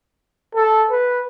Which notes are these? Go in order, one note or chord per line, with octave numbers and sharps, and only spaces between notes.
A4
B4